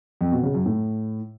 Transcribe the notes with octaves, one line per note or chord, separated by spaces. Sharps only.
F2
B2
C#3
F#2
A2